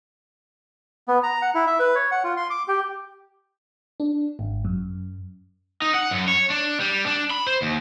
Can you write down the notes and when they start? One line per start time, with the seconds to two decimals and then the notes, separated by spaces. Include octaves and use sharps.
1.08 B3
1.23 A#5
1.42 F#5
1.55 E4
1.67 E5
1.79 B4
1.95 C#5
2.11 F#5
2.24 F4
2.37 C6
2.50 D6
2.68 G4
4.00 D4
4.39 G#1
4.65 F#2
5.82 D#4
5.94 F#5
6.11 F#2
6.28 C#5
6.50 D4
6.80 G3
7.06 D4
7.30 B5
7.47 C5
7.62 D#2